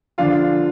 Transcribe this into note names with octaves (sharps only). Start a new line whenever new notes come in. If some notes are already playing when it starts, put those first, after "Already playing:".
D3 F3 D4 F4 F5